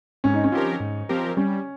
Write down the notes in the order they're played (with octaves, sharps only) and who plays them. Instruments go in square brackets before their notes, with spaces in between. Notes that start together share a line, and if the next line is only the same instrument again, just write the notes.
[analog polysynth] G#2 [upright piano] C#4
[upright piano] D#4
C#4
[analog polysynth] F3 C4 G4 A#4
G#2
F3 C4 G4 A#4
[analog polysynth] G3 [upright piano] C#4